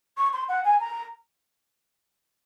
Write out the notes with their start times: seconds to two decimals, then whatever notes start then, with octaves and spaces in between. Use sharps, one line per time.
0.17 C#6
0.33 C6
0.49 F#5
0.64 G#5
0.80 A#5